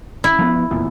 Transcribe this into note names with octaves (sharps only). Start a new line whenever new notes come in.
E4
F3 A3 B3
F1 E2 A#2